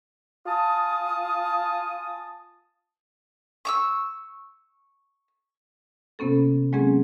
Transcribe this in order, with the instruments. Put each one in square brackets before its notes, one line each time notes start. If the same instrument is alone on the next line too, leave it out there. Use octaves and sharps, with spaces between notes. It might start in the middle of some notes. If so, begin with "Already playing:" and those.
[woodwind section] F4 G#5 A5 D#6
[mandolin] C#6 D6 E6
[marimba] C3 A#3 B3 C#4 A4
F#3 G#3 A#3 C4 C#4 G#4